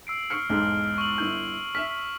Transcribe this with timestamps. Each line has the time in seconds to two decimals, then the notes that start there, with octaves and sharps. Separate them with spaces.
0.07 E6 C7 D7
0.30 C#6 F6 C7 C#7
0.49 B1 E2 G#2 F6
0.98 C#6 F#7
1.18 G1 E4 G6
1.75 E5 F6 B6